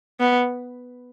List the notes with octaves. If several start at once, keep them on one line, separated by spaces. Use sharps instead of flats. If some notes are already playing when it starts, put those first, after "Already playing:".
B3